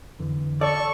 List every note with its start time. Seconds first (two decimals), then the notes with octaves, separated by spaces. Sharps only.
0.19 F2 D3 E3
0.61 A4 D5 C#6